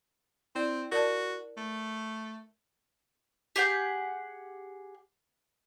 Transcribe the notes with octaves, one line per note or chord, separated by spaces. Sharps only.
C4 E4 D5
F#4 A#4 D5 A5
A3
G4 G#4 F#5 G6